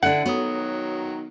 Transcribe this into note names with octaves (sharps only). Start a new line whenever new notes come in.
D3 D4 E4 F#5
D#3 F#3 B3 F#4 C#5 D#6